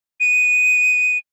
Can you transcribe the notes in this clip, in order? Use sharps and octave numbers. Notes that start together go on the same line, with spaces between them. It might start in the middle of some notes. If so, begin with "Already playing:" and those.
D#7